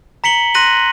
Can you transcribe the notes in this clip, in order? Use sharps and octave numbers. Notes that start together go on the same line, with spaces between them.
A#5 B6 C#7 F#7 G7
C6 F#6 A#6 D#7 F#7